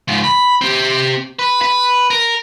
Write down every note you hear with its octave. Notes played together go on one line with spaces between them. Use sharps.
C#2 G#2
B5
C4 G4
B4
B4
A#4